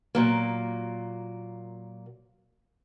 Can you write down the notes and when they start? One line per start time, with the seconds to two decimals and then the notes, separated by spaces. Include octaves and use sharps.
0.15 A#2 F#3 A#3